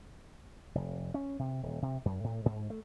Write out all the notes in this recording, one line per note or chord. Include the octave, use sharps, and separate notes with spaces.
F1
C#4
C3
D#1
C3
F#2
A2
G#2
A3